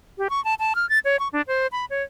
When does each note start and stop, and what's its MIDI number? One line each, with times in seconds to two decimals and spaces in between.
0.18 0.28 67
0.30 0.43 85
0.45 0.54 81
0.59 0.73 81
0.75 0.88 89
0.89 0.99 93
1.05 1.19 73
1.19 1.28 85
1.33 1.42 62
1.48 1.67 72
1.72 1.85 83
1.90 2.03 73